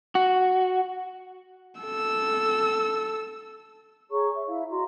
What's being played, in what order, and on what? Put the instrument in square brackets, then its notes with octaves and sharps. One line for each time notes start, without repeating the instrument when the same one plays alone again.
[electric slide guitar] F#4
[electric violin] A4 E6
[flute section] G#4 C#5 A#5 C#6
E5
E4 E5 F5
F#4 D#5 A#5 C6